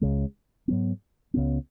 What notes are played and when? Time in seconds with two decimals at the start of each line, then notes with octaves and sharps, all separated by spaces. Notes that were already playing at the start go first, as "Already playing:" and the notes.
0.01 C#2 C#3 G#3
0.68 G#2 F#3 B3
1.34 C#2 C#3 F#3 B3